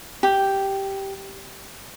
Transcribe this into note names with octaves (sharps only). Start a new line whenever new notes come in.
G4